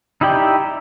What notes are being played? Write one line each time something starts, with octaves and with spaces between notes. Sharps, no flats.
D#4 E4 G4 D5 G5